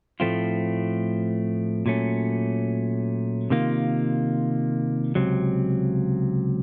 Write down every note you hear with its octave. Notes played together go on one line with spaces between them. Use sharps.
A2 F3 A3 C4 F4
A#2 F#3 A3 C#4
C3 D#3 A#3 F4
C#2 C3 F#3 C4